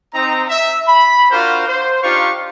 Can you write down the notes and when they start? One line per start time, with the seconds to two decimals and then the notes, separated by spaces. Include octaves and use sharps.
0.14 C4 D#4 A#5
0.49 E5
0.88 B5
1.31 D4 F4 F#4 A#4 C5
1.68 C5
2.03 D4 D#4 F4 G4 F5 C#6